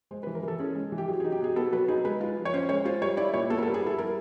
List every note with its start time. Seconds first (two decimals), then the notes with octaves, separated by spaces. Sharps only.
0.11 G#3 C5
0.23 B4
0.27 E3
0.35 A#4
0.43 E3 A4
0.60 C#4 G#4
0.75 G#3
0.92 E3
0.98 G4
1.08 F#3 G#4
1.20 G#4
1.24 D#4
1.32 G4
1.40 B2 G#4
1.56 B3 A4
1.72 F#3 B4
1.88 D#4 G#4
2.05 G#3 B4
2.21 F4
2.37 F3
2.45 C#5
2.54 C#4 C5
2.69 G#3 C#5
2.85 F4 C5
3.02 G3 C#5
3.17 E4 D5
3.34 A#2 C#5
3.50 B3 A4
3.58 A#4
3.62 A4
3.67 G3
3.74 G#4
3.82 E4 A4
3.98 G3 A#4